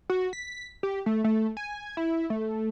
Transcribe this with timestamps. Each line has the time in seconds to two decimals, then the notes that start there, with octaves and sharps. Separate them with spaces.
0.10 F#4
0.33 B6
0.83 G4
1.06 A3
1.24 A3
1.57 G#5
1.97 E4
2.30 A3